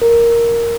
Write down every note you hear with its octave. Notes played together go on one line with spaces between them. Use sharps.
A#4